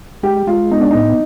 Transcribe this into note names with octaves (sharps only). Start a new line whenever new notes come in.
G#3 G4
G#3 F4
B3 D#4
D4
A2 D#4